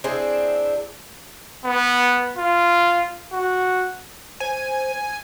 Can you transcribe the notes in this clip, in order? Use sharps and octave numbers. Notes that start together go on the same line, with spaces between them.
C4 D4 E4 G#4
B3
F4
F#4
C5 G#5